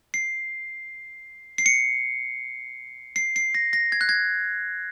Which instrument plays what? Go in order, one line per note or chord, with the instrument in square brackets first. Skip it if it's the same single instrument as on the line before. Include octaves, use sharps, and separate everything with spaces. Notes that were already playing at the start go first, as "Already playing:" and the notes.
[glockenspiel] C7
C7
C#7
C7
C7
A#6
A#6
G#6
F#6
G#6